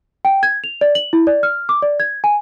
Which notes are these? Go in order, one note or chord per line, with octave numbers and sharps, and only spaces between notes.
G5
G#6
F7
D5
F#7
E4
D5
F6
D6
D5
G#6
G#5